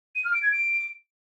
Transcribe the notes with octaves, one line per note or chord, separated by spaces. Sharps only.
D#7
F6
D7
G#6
D7